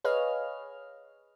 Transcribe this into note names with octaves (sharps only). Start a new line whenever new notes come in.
G#4 B4 C#5 D#5 F5 F6